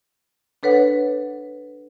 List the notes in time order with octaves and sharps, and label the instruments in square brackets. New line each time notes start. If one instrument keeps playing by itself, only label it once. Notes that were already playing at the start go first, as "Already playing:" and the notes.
[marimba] D4 A4 B4 C#5 F#5